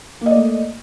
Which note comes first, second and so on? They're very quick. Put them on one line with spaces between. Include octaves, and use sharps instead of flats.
A#3 D#5 D5 A3